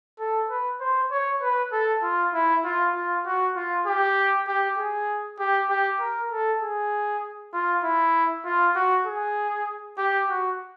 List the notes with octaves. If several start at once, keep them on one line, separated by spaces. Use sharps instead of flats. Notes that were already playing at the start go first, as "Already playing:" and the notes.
A4
B4
C5
C#5
B4
A4
F4
E4
F4
F4
F#4
F4
G4
G4
G#4
G4
G4
A#4
A4
G#4
F4
E4
F4
F#4
G#4
G4
F#4